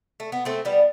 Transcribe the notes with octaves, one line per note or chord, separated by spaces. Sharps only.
A3
B3
A3 C4
G3 B3